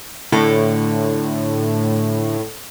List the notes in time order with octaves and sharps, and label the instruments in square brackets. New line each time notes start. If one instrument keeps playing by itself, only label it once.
[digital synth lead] A2 [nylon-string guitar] D3 A4